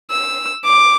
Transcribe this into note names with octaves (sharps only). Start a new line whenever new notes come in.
E6
D6